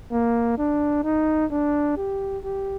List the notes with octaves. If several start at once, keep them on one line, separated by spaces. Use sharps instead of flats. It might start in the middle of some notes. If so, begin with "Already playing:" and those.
A#3
D4
D#4
D4
G4
G4